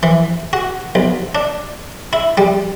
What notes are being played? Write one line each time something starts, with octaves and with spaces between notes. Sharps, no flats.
E3
F#4
B1
D4
E4
G3